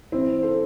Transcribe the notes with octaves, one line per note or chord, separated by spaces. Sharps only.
E3 C4 E4
A4 C5